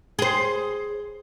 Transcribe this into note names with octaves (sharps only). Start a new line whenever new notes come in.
G#4 C5